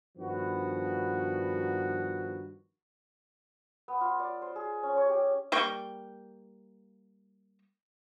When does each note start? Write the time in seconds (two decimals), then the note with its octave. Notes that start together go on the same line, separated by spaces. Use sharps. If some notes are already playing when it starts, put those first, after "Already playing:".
0.18 G2 D#3 F3 B3 F#4
3.88 B3
4.01 F4
4.20 D5
4.42 C5
4.56 G#4
4.83 C#4
4.97 C#5
5.09 G4
5.52 G3 A#3 G5 C#6